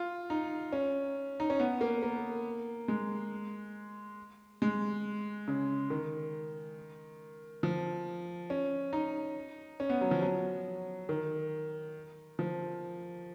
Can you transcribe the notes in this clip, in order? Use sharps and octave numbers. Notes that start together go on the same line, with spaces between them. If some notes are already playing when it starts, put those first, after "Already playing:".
Already playing: F4
D#4
C#4
D#4
C#4
B3
A#3
A#3
G#3
G#3
C#3
D#3
F3
C#4
D#4
C#4
B3
F#3
F3
F#3
D#3
F3